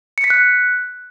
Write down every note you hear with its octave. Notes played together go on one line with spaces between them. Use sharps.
C#7
B6
F#6